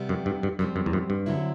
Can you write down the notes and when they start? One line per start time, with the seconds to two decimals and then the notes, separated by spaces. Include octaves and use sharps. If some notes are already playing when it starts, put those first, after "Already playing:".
Already playing: C3 G3 B3
0.09 F#2
0.26 G2
0.43 G2
0.59 F#2 B2 G3 C4
0.76 F#2
0.86 E2
0.93 F#2
1.10 G2
1.26 D3 F#3 C4 E4